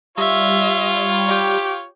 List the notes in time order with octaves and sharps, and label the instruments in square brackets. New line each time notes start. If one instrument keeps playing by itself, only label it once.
[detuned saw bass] G3 [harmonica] F4 C#5 [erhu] E5
[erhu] G4